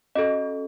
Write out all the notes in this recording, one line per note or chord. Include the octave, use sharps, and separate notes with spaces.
C#4 F#4 A4 D#5